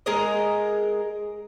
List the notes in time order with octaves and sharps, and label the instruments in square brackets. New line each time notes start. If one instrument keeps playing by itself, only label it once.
[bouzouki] G#3 G#4 A#4 D#5